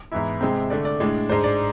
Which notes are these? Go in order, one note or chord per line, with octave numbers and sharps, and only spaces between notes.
G#2 E3 B3 E4 E5
C3 G#3 C4
D3 A3 D4 D5
D5
A2 G#3 D4
G#2 G#3 D4 C5
D5